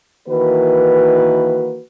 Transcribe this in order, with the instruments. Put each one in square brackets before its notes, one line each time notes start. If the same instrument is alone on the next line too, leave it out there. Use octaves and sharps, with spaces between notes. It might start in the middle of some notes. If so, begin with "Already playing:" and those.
[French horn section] D#3 E3 A#3 F#4 B4